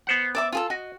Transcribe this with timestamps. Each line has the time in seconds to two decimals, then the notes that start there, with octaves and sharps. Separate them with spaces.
0.07 B3 C5 F#5
0.35 D5 E5 D6
0.52 F4 G#4 A4
0.70 F#4 D#5